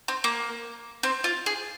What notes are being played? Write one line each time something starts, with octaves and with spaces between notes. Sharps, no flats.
C4
A#3
C4
F4
G#4